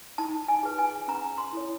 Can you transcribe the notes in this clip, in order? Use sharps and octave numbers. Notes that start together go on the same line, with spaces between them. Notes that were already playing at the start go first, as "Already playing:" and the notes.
D#4 A5
G#5
G#4 B4
G#5
C#4 A#5
C6
E4 A4 C#5